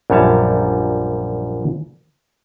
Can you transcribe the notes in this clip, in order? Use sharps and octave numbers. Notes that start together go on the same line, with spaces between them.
A#1 F#2 G3 C#5 E5 A5